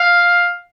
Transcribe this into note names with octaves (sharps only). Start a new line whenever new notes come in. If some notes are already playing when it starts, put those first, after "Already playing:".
Already playing: F5